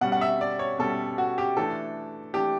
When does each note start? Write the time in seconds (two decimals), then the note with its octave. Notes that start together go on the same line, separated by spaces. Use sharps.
0.01 B2 G3 C#4 F#5
0.12 F#5
0.21 E5
0.41 D5
0.59 C#5
0.79 B2 G3 C#4 A4
1.18 F#4
1.38 G4
1.57 E3 A3 D4 A4
2.34 E3 A3 D4 G4